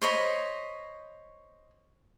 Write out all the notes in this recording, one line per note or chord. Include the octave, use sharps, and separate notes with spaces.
C5 C#5 D#5 B5